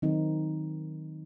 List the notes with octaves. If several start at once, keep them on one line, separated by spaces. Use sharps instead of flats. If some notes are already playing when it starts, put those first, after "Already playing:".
D#3 F#3 C4 D#4